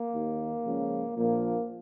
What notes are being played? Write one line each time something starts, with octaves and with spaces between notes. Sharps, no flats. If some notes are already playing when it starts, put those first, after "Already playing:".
Already playing: A#3
D#2 D#3
C#2 C#3 F3
A#1 A#2 F3 A#3